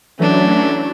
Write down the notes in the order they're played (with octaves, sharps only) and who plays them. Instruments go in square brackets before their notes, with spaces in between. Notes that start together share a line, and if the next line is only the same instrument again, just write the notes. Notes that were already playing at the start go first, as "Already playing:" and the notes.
[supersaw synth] E3 F#3 A3 [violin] C#4 D4